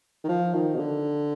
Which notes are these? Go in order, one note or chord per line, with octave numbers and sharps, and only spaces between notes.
D#3
F3
D#3
B2
D3